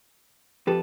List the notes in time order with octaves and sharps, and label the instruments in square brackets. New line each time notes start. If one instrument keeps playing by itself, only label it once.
[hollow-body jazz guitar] F2 A4 B4 [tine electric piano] G4